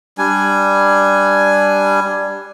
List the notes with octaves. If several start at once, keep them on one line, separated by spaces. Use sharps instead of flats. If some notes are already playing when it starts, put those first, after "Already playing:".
G3 D4 G#5